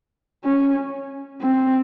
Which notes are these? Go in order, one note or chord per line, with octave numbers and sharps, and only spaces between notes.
C#4
C4